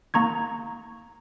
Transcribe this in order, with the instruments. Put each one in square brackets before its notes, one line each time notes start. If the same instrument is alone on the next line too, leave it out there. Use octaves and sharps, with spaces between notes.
[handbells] A#3 A#5 C#6 G#6